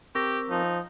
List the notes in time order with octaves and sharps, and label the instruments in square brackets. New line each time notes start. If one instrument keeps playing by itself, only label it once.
[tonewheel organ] C4 A#4 [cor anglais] G4 [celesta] C#6 E6 A#6
[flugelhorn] F3 [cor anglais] D#4